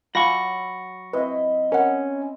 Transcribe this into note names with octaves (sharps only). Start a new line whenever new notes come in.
F#3 F4 F5 G#5 B5 C#6 A#6
C4 E4 B4 D#5
C#4 A#4 F#5